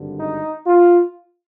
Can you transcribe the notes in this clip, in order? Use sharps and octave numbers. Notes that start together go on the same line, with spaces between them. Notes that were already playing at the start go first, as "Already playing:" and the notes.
Already playing: G#1 G2 D3
D#4
F4